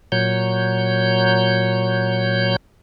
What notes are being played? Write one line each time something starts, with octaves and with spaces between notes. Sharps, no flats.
A#2 F#3 C#5 G6